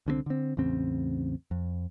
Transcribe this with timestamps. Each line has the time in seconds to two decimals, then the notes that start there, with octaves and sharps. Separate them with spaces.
0.06 C2 D3 G3 C4
0.26 D3 C4
0.57 A1 E2 C#3 C4
1.51 F2